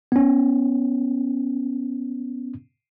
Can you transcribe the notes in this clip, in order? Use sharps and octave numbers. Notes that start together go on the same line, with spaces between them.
B3 C#4